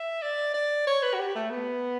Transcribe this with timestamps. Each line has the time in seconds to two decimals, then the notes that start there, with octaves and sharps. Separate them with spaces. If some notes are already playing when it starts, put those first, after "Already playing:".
Already playing: E5
0.22 D5
0.54 D5
0.87 C#5
1.03 B4
1.14 F#4
1.20 G4
1.35 A3
1.50 B3